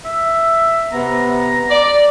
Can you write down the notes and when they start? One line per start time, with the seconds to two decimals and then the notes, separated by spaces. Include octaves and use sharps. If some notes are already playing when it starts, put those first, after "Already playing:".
0.05 E5
0.92 C3 B3 A#5
1.70 D5